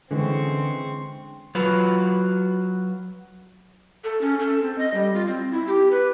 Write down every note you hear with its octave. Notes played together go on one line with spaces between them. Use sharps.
D3 E3 G#3 C4 C#4 C#6
F#3 F4 F#4 B4
A4
C#4
A4
C4
D#5
G3
F4
C4
E4
G4
B4